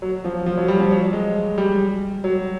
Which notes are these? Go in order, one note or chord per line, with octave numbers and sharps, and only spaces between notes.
F#3
F3
F3
F#3
G3
F3
F#3
G#3
G3
F#3